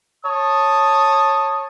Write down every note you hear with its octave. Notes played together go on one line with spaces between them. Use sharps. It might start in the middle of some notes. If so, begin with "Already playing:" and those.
C#5 A5 D#6